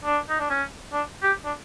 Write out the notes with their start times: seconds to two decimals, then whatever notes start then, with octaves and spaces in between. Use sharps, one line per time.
0.05 D4
0.29 D#4
0.40 D4
0.50 C#4
0.93 D4
1.23 G4
1.45 D4